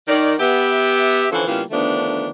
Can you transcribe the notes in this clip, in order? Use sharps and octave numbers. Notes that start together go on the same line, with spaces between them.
D#3 D5
B3 G4 E5
D3 E3 F3 C#4 A4 C5
C#3 G3 A#3 B3 E4 F4
D3 D#3 F3 A3 B3 D4